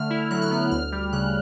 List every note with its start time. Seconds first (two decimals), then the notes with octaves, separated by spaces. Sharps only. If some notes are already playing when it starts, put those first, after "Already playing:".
Already playing: D3 A3 F6
0.10 E4
0.31 F#3 F#6
0.42 F6
0.51 B3 F#6
0.71 D2 F6
0.92 G3
1.12 C#3 F#6